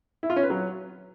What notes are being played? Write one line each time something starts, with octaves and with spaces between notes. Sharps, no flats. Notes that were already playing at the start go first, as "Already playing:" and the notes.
E4
F4
C#4
B4
F#3